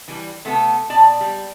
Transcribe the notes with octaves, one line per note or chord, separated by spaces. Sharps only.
E3 G3
C3 A3 B3 A4
B2 D5 A5
G3